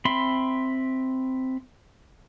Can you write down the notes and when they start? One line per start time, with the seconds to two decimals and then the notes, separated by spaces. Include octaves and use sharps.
0.05 C4 E5 B5 C6